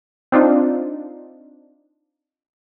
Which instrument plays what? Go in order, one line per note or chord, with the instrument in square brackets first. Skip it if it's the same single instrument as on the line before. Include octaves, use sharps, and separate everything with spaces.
[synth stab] C4 D4 D#4 F4